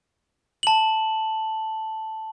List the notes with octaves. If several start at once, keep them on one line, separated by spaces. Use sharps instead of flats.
A5 F#7